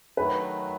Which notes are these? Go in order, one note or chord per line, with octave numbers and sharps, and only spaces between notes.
D#3 F#3 A3 B4